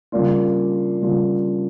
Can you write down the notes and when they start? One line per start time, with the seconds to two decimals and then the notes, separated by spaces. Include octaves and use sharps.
0.12 C#3 G3 A#3 D4 F4
1.02 C#3 G3 A#3 D4 F4